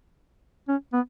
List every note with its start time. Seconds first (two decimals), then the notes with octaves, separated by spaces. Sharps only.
0.68 C#4
0.93 B3